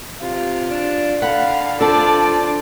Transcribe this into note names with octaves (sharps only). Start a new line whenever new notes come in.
C3 F4
D4
D3 F5 F#5 B5
F3 D4 A4 D5 A5